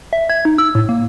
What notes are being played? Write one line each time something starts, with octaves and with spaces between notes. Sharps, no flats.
E5
G#6
D#4
E6
A2
A#3